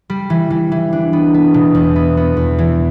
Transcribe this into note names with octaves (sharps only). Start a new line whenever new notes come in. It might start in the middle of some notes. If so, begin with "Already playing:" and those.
G3
E3
E3
E3
D4
B3
B3
B2
E2
B3
B3
E2
E3